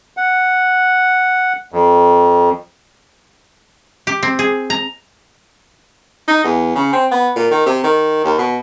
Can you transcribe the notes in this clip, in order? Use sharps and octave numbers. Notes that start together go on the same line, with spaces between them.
F#5
F2
G4
C4
G#4
A#5
D#4
E2
C#3
C4
B3
A#2
D#3
C3
D#3
D#2
B2